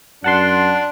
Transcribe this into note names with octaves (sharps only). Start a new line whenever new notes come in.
F#2 D4 F#5 A5 C6